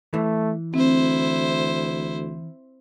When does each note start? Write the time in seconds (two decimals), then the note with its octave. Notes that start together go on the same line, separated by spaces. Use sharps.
0.14 E3 A3
0.74 D2 C4 E4 C5